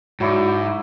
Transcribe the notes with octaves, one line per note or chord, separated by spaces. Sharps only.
G#2 F#3 E4 D5